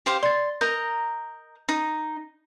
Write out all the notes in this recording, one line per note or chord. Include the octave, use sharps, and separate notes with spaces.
G4 C5 F5
D5 C6 A6
A#4 D#5 A#5 G6
D#4